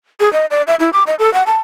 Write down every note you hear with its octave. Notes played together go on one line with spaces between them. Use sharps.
G#4
D#5
D5
E5
E4
D6
D#5
A4
F#5
A5